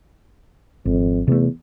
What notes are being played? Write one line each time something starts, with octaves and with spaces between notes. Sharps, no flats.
G#1 F2
E2 C3 A3